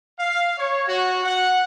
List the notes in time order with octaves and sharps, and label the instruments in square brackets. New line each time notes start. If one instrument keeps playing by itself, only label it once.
[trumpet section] F5
C#5
F#4
F#5